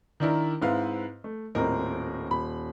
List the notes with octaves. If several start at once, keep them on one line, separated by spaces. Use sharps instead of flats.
D#3 D4 E4 A#4
G#2 C4 E4 B4 F5
A3
D#1 A2 C4 A#4 D#5
D#1 B5